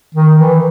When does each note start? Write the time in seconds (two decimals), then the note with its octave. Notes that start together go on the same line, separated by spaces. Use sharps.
0.14 D#3
0.37 E3